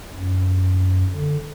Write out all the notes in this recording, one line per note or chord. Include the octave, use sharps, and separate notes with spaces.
F#2
D3